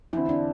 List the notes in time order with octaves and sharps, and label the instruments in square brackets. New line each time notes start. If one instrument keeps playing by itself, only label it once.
[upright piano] E2 D3 C4 [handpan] E4
[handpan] D4